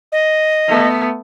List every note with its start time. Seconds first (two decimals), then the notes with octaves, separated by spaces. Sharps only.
0.12 D#5
0.68 A3 B3